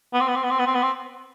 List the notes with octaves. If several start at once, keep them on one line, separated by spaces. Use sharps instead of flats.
B3
C4
B3
C4
B3
C4
B3
C4
B3
C4